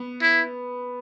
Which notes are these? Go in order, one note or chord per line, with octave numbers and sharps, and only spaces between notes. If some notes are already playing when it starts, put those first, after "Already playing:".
Already playing: B3
E4